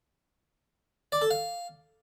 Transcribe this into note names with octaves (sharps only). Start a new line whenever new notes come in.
D5
A4
F5